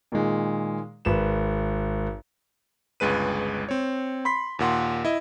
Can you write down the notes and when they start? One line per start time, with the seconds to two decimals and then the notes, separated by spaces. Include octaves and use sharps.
0.12 A#2 D#3 G#3
1.05 G#1 B4 E7
3.00 G1 C#2 G#3 B4 D#7
3.69 C4 C#5
4.25 B5 C6 B6
4.59 D#2 A#2 F#5 C6
5.05 E4 D#5